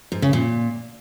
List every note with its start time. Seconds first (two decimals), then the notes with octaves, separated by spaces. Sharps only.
0.12 G#2
0.22 C#3
0.33 A#2